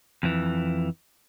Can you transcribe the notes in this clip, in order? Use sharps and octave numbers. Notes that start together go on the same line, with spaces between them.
F2 E3